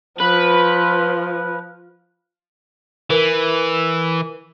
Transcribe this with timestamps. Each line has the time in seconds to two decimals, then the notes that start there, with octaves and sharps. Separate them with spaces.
0.20 F3 B4
3.10 E3 A#4 B4